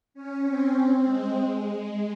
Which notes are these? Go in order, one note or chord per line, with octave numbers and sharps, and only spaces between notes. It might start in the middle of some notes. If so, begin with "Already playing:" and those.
C#4
C4
G#3
G#3